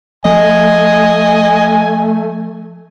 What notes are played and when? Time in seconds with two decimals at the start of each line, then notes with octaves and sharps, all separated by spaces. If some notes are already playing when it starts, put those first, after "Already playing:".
0.25 F3 A3 D#5 G#5